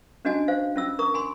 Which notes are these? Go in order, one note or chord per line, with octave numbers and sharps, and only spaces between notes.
C#4 D4 F#4 D#5 G#5 A5
C5 F5
C#4 F4 E6
A#4 A#5 C#6 D#6
G#5 B5 C6